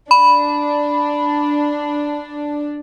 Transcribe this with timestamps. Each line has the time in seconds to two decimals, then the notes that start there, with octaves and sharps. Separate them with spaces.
0.11 D4 B5